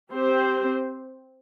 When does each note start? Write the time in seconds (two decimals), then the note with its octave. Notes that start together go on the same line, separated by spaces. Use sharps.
0.13 C4 G4 C5